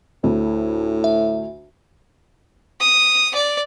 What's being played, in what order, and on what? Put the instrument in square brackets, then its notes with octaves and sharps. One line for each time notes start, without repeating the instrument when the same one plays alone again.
[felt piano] D2 [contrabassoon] A2
[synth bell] E5
[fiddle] D#6
D5